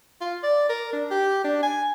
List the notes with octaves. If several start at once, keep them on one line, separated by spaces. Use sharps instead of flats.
F4
D5
A#4
D4
G4
D4
G#5